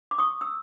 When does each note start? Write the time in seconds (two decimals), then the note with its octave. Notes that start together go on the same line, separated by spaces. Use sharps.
0.11 D6
0.18 C#6 D#6
0.41 E6